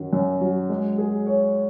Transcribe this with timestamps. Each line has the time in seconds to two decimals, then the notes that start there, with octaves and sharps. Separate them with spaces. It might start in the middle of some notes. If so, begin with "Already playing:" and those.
Already playing: F#2 D#3 F#3
0.13 F#2
0.41 F#3
0.70 G#3
0.98 G#4
1.26 C#5